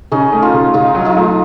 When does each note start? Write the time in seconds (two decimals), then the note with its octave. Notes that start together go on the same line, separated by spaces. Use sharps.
0.12 C#3 C#4 D#4
0.32 A3
0.42 D#4 F4
0.54 C#3
0.74 C#3 D#4 F4
0.95 F#3
1.05 D#4 F4
1.17 A3